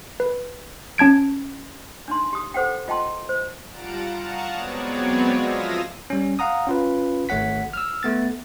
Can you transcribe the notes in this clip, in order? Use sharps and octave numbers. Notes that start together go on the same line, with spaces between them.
B4
C#4 A5 G#6 D7
D4 D#4 C6
G4 D#6
A4 C5 F#5 G5
F4 D#5 G5 A5 C6
C5
G3 F4 F#5 A5 A#5 D7
F5 F#5 A5 A#5 C#6 D#6
F#3 G#3 B3 C4 C#5 D5
F3 E5 F5 D#6 A#6
G3 C#4
F5 F#5 A#5 D#6
C#4 F4 B4
G#1 A3 C#5 F#5 B6
E6 F6
A3 B3 A6